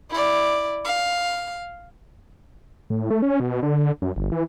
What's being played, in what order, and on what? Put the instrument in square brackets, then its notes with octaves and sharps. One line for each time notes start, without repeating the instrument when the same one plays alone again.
[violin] E4 D5
F5
[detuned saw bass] A2
A3
C#4
B2
D3
F#2
G1
E3